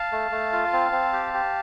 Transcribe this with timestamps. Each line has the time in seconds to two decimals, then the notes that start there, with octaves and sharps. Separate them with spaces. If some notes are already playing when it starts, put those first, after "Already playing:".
Already playing: F5 A5
0.12 A3
0.31 A3
0.52 F4
0.73 C4
0.92 C4
1.13 G4
1.34 G4